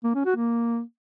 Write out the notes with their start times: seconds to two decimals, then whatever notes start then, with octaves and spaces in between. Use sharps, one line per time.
0.04 A#3
0.15 C#4
0.26 F#4
0.36 A#3